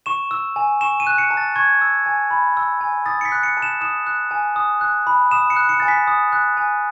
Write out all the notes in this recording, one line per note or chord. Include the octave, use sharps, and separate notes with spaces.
C#6 E7
E6
G#5
C#6 E7
D#7
F#6
C#7
A5
A6
C#6 G#6
E6
G#5
B5
E6
G#5
D#6 A6
C#7
B6
F#6
C#7
A5
E7
D#6 E7
F#6
G#5
D#6
F#6
B5
D#6 E7
C#7
F#6
C#7
G#5 A6
B6
D#6
F#6
G#5